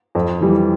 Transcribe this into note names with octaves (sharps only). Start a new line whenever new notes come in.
F2
E3 G3